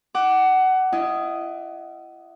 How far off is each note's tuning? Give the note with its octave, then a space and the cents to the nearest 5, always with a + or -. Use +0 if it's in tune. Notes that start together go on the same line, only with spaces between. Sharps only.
F#5 +20 D6 +0
E4 +35 D#5 +0